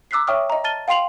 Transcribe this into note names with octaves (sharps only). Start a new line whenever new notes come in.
A#5 D6 E6 F#6 B6 C7
C#5 E5 G5 C#6 D#6 F6
D#5 A#5
A5 F6 A6 D#7 G7
F5 G5 C6 C7 F7 F#7